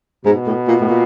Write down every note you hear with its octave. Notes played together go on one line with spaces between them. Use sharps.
G#2 B2
A2
A#2
A2
A#2